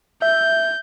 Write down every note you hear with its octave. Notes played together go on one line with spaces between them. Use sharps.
E5 G6